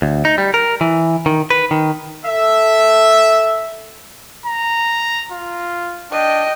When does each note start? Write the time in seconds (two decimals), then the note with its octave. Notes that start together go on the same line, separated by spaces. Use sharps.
0.02 D2
0.25 D#4
0.38 G3
0.54 A#4
0.81 E3
1.26 D#3
1.50 B4
1.71 D#3
2.25 A4 E5
4.46 A#5
5.32 F4
6.12 D4 D#5 G5